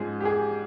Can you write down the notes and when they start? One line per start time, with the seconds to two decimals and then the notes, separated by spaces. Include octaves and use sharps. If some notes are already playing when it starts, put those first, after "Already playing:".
Already playing: G#2 F3 G#3 C#4 G#4
0.20 G4
0.25 G#4